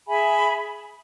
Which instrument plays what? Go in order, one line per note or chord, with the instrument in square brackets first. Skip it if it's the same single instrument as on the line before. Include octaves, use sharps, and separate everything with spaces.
[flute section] G#4 E5 G#5 B5